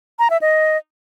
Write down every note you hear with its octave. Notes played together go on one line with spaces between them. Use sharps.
A#5
E5
D#5